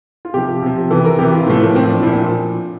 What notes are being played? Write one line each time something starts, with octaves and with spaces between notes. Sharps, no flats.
F4
C3 F3 G4
C3 F3
C3 E3 A4
A#4
C3 E3 G4
F4
A2 F3 A3
A#3
A2 F3 C4
D4
A#2 F3 E4